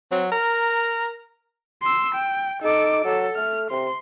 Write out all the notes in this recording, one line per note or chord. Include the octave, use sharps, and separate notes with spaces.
F#3 C4
A#4 A#5
C6 E6
G5
D#4 A4 D6
F#3 A4
A3 F6
C3 C6